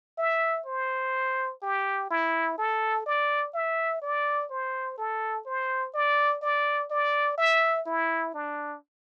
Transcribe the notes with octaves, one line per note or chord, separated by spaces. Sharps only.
E5
C5
G4
E4
A4
D5
E5
D5
C5
A4
C5
D5
D5
D5
E5
E4
D4